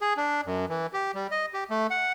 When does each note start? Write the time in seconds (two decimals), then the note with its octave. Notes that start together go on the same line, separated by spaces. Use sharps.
0.01 G#4
0.17 D4
0.46 F#2
0.69 E3
0.93 G4
1.15 G3
1.31 D#5
1.54 G4
1.70 A3
1.90 F#5